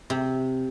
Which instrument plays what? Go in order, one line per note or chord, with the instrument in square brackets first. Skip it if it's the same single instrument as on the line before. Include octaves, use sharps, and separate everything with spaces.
[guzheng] C3